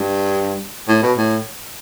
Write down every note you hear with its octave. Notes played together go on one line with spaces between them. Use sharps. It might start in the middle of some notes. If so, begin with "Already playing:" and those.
Already playing: G2
A2
B2
A2